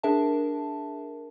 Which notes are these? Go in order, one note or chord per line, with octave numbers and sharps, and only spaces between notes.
D4 G#4 A#4 E5 A5